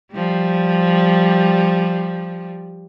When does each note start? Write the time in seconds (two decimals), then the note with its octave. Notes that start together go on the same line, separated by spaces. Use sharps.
0.13 F3 G3